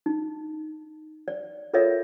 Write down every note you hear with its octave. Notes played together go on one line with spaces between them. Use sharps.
D#4
D5
F4 A4 A#4 C#5 D#5 E5